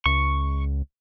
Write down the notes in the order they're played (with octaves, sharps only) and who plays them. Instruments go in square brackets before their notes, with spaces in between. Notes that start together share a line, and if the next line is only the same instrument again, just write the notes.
[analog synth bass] C#2 [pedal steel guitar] C#6